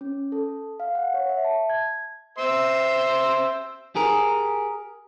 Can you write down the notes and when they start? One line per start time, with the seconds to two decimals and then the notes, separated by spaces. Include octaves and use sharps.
0.01 C#4
0.32 A4
0.80 F5
0.95 F#5
1.14 C#5
1.29 E5
1.45 A5
1.70 G#6
2.38 C5 E5 C6
3.95 G4 G#4 A#4